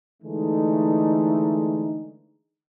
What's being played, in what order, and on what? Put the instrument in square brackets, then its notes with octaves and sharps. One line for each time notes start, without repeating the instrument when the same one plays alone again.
[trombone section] D3 E3 G#3 A3 D#4